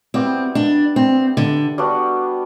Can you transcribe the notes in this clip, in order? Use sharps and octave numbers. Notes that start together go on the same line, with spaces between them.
G3 B3 C4 E4 G4
D4
C4
D3
G3 B3 D4 F#4